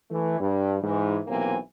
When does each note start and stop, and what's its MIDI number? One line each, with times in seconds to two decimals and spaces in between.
0.11 0.40 52
0.11 0.40 57
0.40 0.76 43
0.40 0.76 55
0.81 1.19 44
0.81 1.19 52
1.27 1.55 35
1.27 1.55 48
1.27 1.55 52
1.27 1.55 58
1.27 1.55 60
1.27 1.55 80